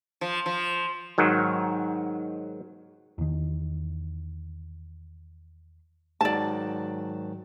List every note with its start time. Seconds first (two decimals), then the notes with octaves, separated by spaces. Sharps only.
0.21 F3
0.46 F3
1.18 G#2 D#3 F#3
3.18 E2 D#3
6.21 G#2 D#3 F#3 D5 A5